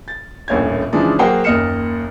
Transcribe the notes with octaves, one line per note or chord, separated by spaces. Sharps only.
A6
D#1 A#1 A2 C#4 G#6
C#3 E3 F3 G#3 D4 D#4
F#3 A#3 G#4 C5 F#5 G5
F#1 D#2 D#5 F6 C#7 E7